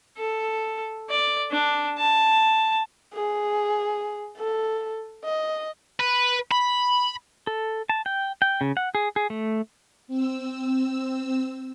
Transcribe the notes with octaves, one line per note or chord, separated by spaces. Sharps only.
A4
D5
D4
A5
G#4
A4
D#5
B4
B5
A4
A5
G5
G5
C#3
F#5
G#4
G#4
A3
C4 E6